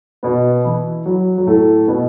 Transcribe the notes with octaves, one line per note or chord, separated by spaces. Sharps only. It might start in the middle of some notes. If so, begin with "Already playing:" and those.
B2 B3
E3 E4
F#3
F#3
A2 A3
B2 B3